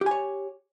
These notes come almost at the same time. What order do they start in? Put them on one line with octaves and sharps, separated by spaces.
G4 G#5 C#5